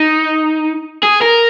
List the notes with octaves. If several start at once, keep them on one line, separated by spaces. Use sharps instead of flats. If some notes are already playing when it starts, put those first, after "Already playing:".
Already playing: D#4
G#4
A#4